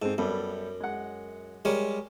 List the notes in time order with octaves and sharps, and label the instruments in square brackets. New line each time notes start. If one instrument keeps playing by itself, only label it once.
[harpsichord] G#2 [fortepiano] C4 A4
[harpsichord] F#2 [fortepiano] G3 B3 A4
[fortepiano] G#3 F#5
[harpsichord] G3 G#3 C#5 [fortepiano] A#4